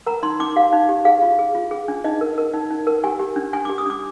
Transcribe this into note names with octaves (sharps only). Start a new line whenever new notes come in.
A#4 A#5
D#4 C6
D#4 D6
G4 F5
D#4
G4
G#4 F5
F4
G#4
F4
G#4
D4
D#4 D#5
A#4
A#4
D#4
D#4
A#4
G4 G#5
G4
D4
D4 G#5
D6
G4
D#6
D4 D6